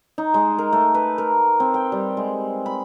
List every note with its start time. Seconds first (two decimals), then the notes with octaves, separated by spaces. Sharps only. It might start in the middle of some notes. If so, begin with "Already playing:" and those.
0.18 D#4
0.34 G#3
0.59 A#4
0.73 A3
0.94 B4
1.18 A#4
1.60 C4
1.74 G5
1.92 G3
2.17 G#3
2.66 B5